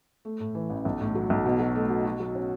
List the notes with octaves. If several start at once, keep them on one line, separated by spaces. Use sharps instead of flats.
A3
A2
E3
A1
B1
A2
F#3
B1
B2
F#3
A3
B2
F#4
F#3
C#4